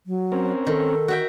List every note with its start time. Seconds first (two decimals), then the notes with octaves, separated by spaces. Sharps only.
0.06 F#3
0.32 C4 C#4 A#4
0.67 D#3 A4
1.08 F#4 E5 G5